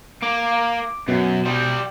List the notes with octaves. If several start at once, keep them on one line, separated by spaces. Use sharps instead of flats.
A#3 D6
F#2 B2
G3 C5